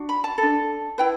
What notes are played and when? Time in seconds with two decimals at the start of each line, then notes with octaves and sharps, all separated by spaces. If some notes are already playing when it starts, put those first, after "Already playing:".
Already playing: D4 F#4
0.09 B5
0.24 A5
0.38 A4
0.43 D4
0.98 E4 B4 G5